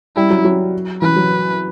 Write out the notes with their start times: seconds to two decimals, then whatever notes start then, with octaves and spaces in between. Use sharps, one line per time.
0.16 G3 E4
0.30 F#3
0.45 F#3
1.02 E3 B4
1.16 F#3